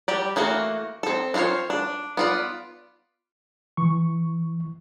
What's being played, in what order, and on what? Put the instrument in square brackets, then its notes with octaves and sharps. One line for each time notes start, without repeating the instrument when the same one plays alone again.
[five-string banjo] G3 G4 D5
E3 A3 A#3 F#4
C4 A4
D4 F4 A#4 C5 C#5
D4
B3 F4 D5
[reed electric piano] E3 C#6